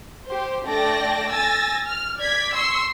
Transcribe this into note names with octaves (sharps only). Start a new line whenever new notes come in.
G4 C5
A3 D4 D5 G5 A5 A#6
G#5 E6 A6 A#6
F6
D5 G#6 B6
C6 C#6 E6 C7